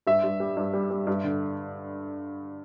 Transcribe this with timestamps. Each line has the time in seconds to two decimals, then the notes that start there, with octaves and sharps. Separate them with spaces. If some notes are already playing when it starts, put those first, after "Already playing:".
0.07 G2 E5
0.23 G2
0.40 G3
0.57 G2
0.73 G3
0.90 G3
1.07 G2
1.24 D3